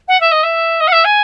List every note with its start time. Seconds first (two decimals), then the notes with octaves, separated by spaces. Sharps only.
0.08 F#5
0.20 E5
0.31 D#5
0.43 E5
0.80 D#5
0.87 F#5
0.92 E5
1.04 G#5